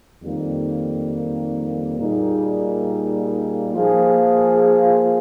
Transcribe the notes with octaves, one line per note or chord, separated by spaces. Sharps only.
F2 D#3 G3 A#3
A#2 G3 A#3 D#4 G#4
F3 A#3 F4 G#4